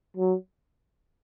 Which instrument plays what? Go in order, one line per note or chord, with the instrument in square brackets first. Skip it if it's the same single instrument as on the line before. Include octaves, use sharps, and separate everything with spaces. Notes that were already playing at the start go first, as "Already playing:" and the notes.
[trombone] F#3